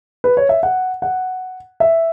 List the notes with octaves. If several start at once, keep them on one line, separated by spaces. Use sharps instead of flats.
B4
C#5
E5
F#5
F#5
E5